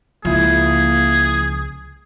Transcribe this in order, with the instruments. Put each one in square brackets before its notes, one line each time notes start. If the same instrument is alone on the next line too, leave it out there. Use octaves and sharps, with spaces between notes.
[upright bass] C#2 [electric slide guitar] F3 E4 [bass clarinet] A#3 [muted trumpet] G#4